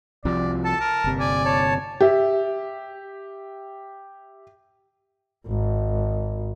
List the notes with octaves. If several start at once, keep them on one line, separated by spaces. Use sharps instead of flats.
C2 C3 F3 D5
A4 A5
A#4
G1 C3
D5 G#5
C#5 A5
G4 E5
G#1